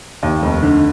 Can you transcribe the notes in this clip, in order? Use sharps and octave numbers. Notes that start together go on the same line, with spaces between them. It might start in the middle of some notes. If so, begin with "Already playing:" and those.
D#2
F1
D3